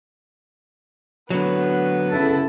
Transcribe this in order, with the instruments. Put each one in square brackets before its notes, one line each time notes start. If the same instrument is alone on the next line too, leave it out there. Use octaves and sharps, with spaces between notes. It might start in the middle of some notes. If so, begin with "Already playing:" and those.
[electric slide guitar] D3 F#3 [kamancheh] B3 B4
[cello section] C#3 E4 A4